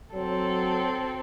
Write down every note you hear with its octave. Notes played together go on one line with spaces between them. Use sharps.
F#3 C4 A4